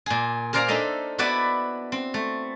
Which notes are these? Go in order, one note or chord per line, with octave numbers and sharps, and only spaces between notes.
A#2 G#4
G#4 A#4 C5 D5 F5 A#5
D4 D#4 A4 D#5 E5
B3 E4 F#4 B4 D5 A5
C4
A3